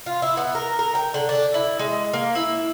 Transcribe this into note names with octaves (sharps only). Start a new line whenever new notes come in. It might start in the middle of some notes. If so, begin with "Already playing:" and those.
F4
E4
B3
A#4
A#4
G5
D3
D4
E4
G#3
A#3
E4